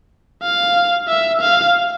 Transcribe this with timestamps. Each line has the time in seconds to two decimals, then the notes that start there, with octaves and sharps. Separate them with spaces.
0.43 F5
1.08 E5
1.42 F5